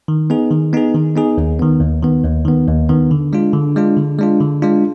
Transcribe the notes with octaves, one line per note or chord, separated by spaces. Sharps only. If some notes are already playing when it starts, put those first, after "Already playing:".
D#3
B3 D#4 G#4
D#3
B3 D#4 G#4
D#3
B3 D#4 G#4
D#2
D#3 B3
D#2
D#3 B3
D#2
D#3 B3
D#2
D#3 B3
D3
G#3 D4 F4
D3
G#3 D4 F4
D3
G#3 D4 F4
D3
G#3 D4 F4